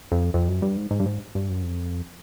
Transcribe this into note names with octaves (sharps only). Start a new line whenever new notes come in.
F2
F2
F#2
G2
G#2
G#2
G2
G#2
G2
F#2
F2